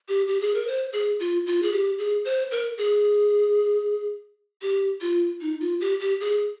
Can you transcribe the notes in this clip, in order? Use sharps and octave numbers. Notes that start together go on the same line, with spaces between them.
G4
G4
G#4
A#4
C5
G#4
F4
F4
G#4
G4
G#4
C5
A#4
G#4
G4
F4
D#4
F4
G4
G4
G#4